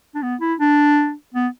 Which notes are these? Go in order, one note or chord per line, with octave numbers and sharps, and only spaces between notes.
D4
B3
E4
D4
B3